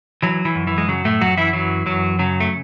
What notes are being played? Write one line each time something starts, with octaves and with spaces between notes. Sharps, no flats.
E3 F#3
E3
F#2
E3
G#3
C#3 F#3
A2 A3
F#2 F#3 F#4
E3 E4
E3 F#3
F#2 F#3
C#3 F#3
A3